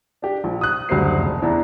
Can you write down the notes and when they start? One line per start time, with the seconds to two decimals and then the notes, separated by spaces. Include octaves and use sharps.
0.22 D4 G4
0.44 A#1
0.61 D#6 F#6
0.89 F#1 D2 G3 C5 C7
1.18 F1
1.42 E2 D4 E4 A#5